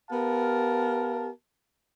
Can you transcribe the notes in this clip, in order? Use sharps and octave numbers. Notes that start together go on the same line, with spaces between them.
B3 G4 A#4 F5 A5